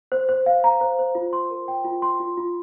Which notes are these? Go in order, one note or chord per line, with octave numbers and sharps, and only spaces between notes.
C5
C5
F5
A#5
C5
C5
F4
C6
A#4
G5
F4
C6
F4
F4